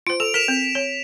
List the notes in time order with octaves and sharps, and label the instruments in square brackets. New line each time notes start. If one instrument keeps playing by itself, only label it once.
[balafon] F4 C5 [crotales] D7
[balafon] A4 [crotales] F7
[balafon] A#4 [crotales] B6 E7 F7
[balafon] C4
C#5